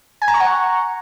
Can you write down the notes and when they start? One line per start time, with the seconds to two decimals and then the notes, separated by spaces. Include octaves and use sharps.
0.22 G#5
0.28 A#5
0.34 C#6
0.40 F#5